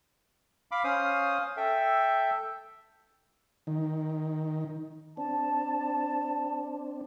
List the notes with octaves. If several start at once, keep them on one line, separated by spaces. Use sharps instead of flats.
F5 B5 D6
C#4 C5 F5 D#6
A4 E5 G5
D#3
C4 D4 A5